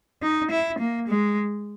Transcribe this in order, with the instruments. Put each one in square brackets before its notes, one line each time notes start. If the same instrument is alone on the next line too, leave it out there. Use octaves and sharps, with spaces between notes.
[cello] D#4
E4
A#3
G#3